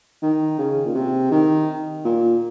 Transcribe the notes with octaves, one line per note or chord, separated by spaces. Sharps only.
D#3
C#3
A#2
C3
D#3
A#2